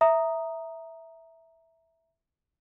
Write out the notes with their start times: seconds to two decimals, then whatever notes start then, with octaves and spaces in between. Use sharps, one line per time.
0.01 E5 A#5 D#6